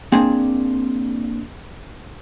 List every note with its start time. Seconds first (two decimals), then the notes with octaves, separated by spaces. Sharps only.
0.12 A#3 C4 D4 G#4